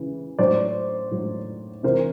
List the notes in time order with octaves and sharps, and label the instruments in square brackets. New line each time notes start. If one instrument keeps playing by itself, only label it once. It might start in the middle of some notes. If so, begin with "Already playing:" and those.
Already playing: [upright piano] C#3 E3
A2 F#3 C5 D5
A2 F#3
C3 E3 A#4 C5